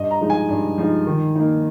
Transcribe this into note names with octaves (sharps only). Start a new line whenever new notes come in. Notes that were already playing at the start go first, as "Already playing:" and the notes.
Already playing: G2 D#5
A#5
F3 G#3 D#4
G#5
G2
F3 G#3 D#4
D#3
A#3 D#4